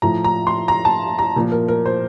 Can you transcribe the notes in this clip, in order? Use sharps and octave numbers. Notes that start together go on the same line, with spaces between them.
A2 F3 A#5
A#5
C6
A#5
A5
A#5
A#2 F3
A#4
A#4
C5